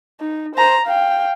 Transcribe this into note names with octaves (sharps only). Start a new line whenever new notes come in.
D#4
C5 A#5
F5 G5